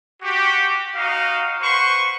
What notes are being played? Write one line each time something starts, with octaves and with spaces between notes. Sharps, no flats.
F#4 G4
D#4 F#4 F5
B4 C5 F#5 C6 C#6